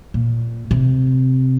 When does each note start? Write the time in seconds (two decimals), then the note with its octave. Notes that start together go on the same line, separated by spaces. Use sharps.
0.14 A#2
0.71 C3